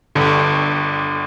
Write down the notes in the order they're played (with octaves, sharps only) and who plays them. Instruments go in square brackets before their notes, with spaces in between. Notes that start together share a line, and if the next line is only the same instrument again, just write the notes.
[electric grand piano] G1 G2 D3